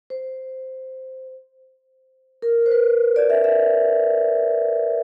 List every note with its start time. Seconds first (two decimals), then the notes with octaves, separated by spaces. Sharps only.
0.10 C5
2.42 A#4
2.66 C5
2.71 B4
3.16 D5
3.30 E5
3.44 E5